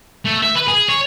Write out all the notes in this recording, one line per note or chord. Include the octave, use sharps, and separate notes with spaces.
A3
E5
B4
G#4
C#5